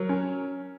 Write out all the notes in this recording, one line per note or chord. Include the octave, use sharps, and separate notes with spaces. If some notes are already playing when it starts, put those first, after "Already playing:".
Already playing: F#3 A#4
C#4